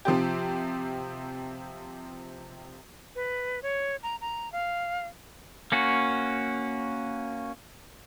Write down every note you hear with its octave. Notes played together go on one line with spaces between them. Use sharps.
C3 F3 C4 G4
B4
C#5
A#5
A#5
F5
A#3 C#4 F#4